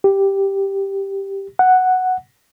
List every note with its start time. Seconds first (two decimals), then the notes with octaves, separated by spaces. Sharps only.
0.04 G4
1.59 F#5